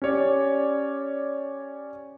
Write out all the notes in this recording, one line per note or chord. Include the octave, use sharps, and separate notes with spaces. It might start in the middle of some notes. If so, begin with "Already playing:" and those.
C#4 G4 C#5 D5